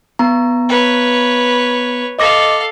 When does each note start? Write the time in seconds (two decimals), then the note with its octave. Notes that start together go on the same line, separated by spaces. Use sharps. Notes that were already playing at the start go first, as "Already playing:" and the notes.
0.19 B3 A#5
0.69 B4 C#5
2.19 A4 D#5 F5 D6 A#6